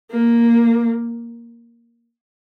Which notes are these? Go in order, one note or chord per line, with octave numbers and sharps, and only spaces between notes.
A#3